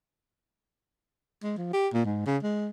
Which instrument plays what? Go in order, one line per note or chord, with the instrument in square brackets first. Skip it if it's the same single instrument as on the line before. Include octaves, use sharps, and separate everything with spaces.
[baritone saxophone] G#3
F3
G4
A#2
G#2
C#3
G#3